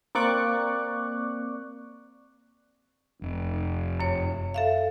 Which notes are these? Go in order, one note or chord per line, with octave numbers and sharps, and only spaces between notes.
A#3 C4 D5 C#6 D6 F#6
F1
F#2 C#5
A4 E5 F5